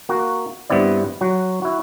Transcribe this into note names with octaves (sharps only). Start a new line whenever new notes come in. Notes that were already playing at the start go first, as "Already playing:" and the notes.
A#3 F#4
G2 B3 C4 E4 D5
F#3 F#4
E4 F#4